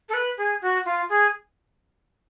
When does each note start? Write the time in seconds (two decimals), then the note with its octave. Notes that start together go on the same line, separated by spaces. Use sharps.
0.09 A4
0.14 B4
0.38 G#4
0.61 F#4
0.85 F4
1.09 G#4